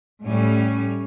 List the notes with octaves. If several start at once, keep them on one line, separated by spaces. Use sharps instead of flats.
A2 G3 C#4